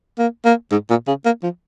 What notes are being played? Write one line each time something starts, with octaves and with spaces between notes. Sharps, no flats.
A#3
A#3
G#2
A#2
C#3
A#3
F3